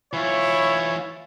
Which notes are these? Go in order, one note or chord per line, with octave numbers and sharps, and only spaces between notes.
E3 E4 F4 C#5